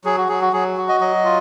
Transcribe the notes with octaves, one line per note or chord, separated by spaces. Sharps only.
F#3 G#4
F#4
F#3 G#4
F#4
F#3 G#4
F#4
D#5
F#3 D#5
F4